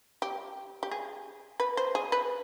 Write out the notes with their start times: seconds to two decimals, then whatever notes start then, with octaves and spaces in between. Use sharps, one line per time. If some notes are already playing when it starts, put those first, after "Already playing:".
0.22 G4
0.83 G4
0.91 G#4
1.60 B4
1.77 C5
1.95 G#4
2.12 B4